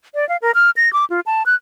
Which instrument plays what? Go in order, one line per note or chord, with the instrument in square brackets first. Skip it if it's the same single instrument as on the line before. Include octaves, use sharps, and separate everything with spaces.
[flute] D5
F5
A#4
F6
A#6
D6
F4
A5
F#6